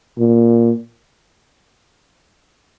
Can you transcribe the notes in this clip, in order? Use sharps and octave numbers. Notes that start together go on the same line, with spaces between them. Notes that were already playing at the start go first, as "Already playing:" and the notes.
A#2